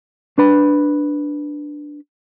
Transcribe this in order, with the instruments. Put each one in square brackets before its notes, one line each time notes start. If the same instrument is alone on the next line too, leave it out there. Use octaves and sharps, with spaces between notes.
[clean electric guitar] D4 B4 B5